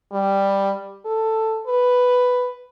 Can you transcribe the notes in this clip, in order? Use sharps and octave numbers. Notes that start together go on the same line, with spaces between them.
G3
A4
B4